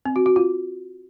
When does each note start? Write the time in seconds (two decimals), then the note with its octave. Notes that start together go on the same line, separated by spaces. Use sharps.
0.05 C4
0.16 F#4
0.26 F#4
0.36 F4